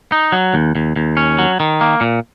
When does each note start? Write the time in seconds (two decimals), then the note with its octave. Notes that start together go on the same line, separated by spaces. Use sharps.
0.12 D#4
0.32 F#3
0.54 D#2
0.75 D#2
0.96 D#2
1.17 C#4
1.39 F#3
1.60 D#3
1.81 A#3
2.01 A#2